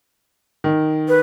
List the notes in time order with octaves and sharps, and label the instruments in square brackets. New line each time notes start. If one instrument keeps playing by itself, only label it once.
[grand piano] D#3
[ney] B4